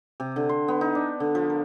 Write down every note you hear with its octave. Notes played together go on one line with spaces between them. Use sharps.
C3
D3
C6
B3
D#4
D4
D3
F3
A#4